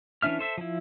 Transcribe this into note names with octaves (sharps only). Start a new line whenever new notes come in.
E3 C#4 D4 E5 F6
A4 C5 E5
F3 E4